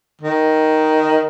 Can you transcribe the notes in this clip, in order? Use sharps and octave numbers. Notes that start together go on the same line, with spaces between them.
D#3